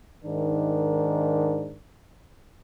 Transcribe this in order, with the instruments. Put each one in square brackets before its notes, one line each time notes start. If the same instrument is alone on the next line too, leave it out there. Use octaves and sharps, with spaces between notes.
[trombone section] G#2 D#3 D4 A#4